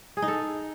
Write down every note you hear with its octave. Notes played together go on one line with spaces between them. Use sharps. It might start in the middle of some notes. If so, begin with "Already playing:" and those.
G#4
D#4
A4